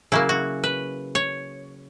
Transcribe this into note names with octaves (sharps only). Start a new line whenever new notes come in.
C#3 F#3 A#3 E4
F#4
B4
C#5